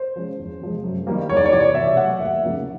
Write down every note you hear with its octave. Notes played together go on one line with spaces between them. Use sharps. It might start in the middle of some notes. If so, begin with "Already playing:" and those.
Already playing: C5
F3 G#3 C#4
E2
C3 F3 G#3
F#2
D#3 G3 A#3
E2 C#5
D5
C#5
C3 E3 D5
C#5
B2 E5
F#3 A3 F#5
D#2 E5
C#3 F3 A#3 D#4